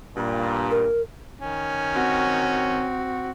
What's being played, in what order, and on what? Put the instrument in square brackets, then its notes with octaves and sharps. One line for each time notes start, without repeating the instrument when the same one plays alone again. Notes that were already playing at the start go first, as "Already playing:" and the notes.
[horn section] G2 A#2
[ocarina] A#4
[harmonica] D#3 C#4
[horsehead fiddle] C4 F#4